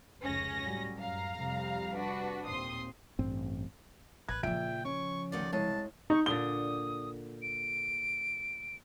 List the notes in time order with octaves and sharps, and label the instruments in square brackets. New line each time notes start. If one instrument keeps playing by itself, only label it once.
[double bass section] F1 C#2 C#3 [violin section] C#4 A#6
[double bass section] A2 F#3 G3
[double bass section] F#2 [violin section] F5 A#5
[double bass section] F2 C3 G3
[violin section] D4 F#4 B4
[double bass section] D#2 A#2 C4 [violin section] C6 D#6
[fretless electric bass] A1 G2 C4
[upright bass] A1 [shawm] B4 [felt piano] G#6
[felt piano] A#2 E5 D7 [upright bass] C#3 F3 [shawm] G5
[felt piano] C#4 [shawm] C#6
[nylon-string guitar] D2 D#3 F#5 [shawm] D5
[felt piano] C2 [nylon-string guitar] G#3 C#5 [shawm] A5
[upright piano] D#4 [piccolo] C#6
[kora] A#2 D3 D5 [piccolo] D#6 [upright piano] G7
[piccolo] D7